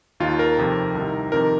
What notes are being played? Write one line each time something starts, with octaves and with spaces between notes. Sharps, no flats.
D#2 D#3 F4
A#4
F2 C3 D#3
C2 C3 D#3
F2 C3 D#3 A#4